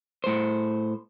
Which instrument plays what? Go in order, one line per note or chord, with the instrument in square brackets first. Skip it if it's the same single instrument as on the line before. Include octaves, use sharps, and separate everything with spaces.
[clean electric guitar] A2 C5